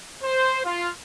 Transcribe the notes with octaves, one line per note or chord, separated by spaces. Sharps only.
C5
F4